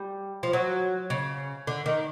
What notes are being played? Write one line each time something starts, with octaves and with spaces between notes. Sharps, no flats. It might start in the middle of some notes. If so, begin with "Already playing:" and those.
Already playing: G3
F3
F#3
C#3
D3
D#3